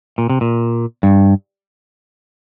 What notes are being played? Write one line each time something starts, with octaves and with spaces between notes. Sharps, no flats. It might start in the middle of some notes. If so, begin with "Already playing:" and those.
A#2
C3
A#2
G2